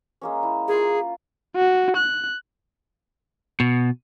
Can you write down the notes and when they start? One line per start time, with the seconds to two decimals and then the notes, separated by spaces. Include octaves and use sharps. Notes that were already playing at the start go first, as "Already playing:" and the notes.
0.21 G#3 A#3 C#4
0.43 E4
0.68 F4 G#4 A#4
1.56 F#4
1.97 F#6
3.60 B2